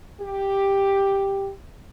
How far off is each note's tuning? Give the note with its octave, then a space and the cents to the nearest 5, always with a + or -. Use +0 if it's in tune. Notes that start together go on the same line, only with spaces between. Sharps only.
G4 +5